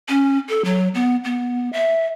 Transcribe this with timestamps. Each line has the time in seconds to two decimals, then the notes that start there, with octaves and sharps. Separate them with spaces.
0.09 C#4
0.49 A4
0.65 F#3
0.95 B3
1.24 B3
1.73 E5